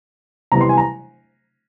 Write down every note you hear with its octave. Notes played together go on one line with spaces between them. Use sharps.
C3 E3 G3 B3 A#5
C6
G#5
A#5